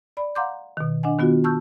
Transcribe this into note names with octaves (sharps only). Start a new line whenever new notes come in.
D5 B5
F5 F#5 A#5 C6 D6 G6
B2 D#3
D4 D#5 F#5 G#5
D#3 B3 F4 F#4
A5 C#6 E6 F6 G6